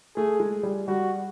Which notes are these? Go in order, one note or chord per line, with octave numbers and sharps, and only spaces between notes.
A3 G#4
G#3
G3
G3 F#4